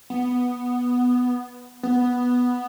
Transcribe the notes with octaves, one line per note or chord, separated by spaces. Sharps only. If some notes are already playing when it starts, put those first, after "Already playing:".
B3
B3